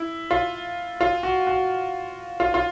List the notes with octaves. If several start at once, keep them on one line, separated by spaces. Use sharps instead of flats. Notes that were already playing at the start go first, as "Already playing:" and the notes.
Already playing: E4
F4
F4
F#4
F#4
F4
F4